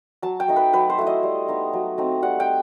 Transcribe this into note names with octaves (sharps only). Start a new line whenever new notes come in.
F#3 A5
G5
A3 D#4
B4
F#3 B4
C5
A3 E4
D#5
G3
B3 D#4
F#3
A3 C4 D#4
G3 F#5
G5